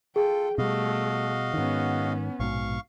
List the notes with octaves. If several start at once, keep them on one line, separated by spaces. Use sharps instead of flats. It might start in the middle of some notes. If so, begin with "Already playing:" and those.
F4 G#4 A4 G5
B2 G3 A3 F#4 D#5 F5
G#2 D#3 B3 C#4
A#1 G#2 B2 F5 C#6